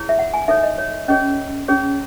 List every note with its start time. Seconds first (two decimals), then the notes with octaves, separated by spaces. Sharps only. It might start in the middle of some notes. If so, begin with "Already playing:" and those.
Already playing: E4 G#4 C#5
0.09 E5
0.19 F#5
0.34 G#5
0.48 D#4 A4 C#5 E5
0.63 D#5
0.78 C#5
1.08 C#4 G#4 C#5 D#5
1.68 C#4 G#4 C#5